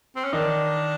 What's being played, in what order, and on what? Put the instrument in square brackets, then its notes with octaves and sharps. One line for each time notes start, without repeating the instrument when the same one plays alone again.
[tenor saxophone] C4
C#4
[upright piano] D#3 D#4 [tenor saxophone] D4